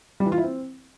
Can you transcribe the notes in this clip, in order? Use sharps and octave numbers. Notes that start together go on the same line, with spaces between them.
G3
E3
F4
E4
C4